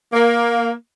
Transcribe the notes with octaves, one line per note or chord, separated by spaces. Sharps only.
A#3